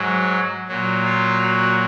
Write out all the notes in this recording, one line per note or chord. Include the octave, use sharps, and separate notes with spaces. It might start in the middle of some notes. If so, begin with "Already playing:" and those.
Already playing: G#2 F#3
A#2 F#3
F4
F#4